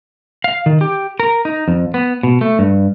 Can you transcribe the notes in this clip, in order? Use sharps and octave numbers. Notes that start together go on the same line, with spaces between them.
F5
D#3
G4
A#4
D#4
F2
B3
B2
A3
G2